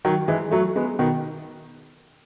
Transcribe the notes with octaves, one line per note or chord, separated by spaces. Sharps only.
D#3 F#3
E3 G#3
F#3 A3
G#3 B3
B2 D#3